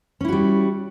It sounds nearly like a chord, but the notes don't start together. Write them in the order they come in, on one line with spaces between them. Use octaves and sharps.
C#4 E4 F#4 G3